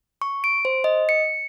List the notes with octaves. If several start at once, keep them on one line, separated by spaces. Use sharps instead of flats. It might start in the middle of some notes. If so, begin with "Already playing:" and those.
C#6
D7
C5
D#5
C#7